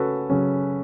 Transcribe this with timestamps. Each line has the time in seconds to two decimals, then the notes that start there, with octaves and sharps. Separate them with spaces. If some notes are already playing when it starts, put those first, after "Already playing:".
Already playing: C#3 C#4 F#4 A4 B4
0.30 C#3 F#3 C#4